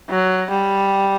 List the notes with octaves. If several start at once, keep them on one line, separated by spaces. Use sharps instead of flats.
F#3
G3